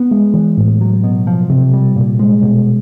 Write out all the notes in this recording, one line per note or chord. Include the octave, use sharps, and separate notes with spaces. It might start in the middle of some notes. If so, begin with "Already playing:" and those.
Already playing: B3
G#3
E3
A2
F#3
B2
F3
C3
G3
A#2
G#3
B2